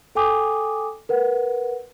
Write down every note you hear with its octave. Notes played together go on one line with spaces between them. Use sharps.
A4 G5 G#5 D6 D#6
A#4 B4 F#5